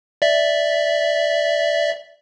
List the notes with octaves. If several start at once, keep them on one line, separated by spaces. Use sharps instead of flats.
D5 E5